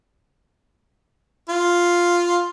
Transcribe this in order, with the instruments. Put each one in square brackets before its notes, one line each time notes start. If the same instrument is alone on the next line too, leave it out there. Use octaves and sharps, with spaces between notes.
[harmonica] F4